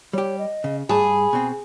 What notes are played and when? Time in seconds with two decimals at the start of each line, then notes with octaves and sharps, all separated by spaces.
0.13 G3 G4 C#5
0.39 D#5
0.64 C#3
0.89 G2 G#4 A5 B5
1.33 B2 C4